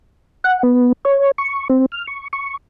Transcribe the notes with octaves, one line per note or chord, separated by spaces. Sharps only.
F#5
B3
C#5
C#6
C4
F6
C#6
C#6